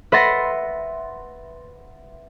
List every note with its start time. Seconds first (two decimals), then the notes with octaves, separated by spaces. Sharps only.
0.12 B4 E5 F#5 C6 A6 A#6